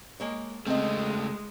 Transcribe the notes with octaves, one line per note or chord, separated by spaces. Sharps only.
G#3 A#3 C#5
C#3 G#3 A3 C4 D#5